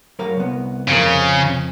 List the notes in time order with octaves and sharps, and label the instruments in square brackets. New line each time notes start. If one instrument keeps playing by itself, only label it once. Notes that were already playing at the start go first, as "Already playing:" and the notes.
[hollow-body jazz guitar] F#3 A#4 F5
C2 B3
[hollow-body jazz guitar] F2 F3 A#4 [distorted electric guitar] C#3